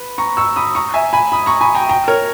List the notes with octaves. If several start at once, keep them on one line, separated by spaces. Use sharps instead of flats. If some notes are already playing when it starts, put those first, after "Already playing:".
Already playing: B4
A#5 C#6
C#6 E6
B5 D#6
A#5 C#6
E5 G#5
G#5 B5
B5 D#6
A#5 C#6
G#5 B5
G5 A#5
G5 A#5
A#4 C#5